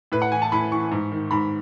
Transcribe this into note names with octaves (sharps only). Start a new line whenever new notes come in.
A2 B4
F#5
E3 G#5
A5
A2 B5
E3 C#6
G#2
D#3
G#2 B5